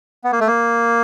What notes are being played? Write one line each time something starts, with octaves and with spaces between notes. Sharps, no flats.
B3
A#3
A3
A#3